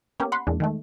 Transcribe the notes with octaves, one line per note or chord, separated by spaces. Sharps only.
A#3 B3 C#4 G4
F#5 B5 C6
E2 A#2 E3 G#3 D4
D#3 G#3 A3